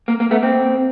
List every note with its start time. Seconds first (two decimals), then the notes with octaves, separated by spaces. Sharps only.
0.08 A#3
0.20 A#3
0.31 A3 B3
0.42 A#3 C4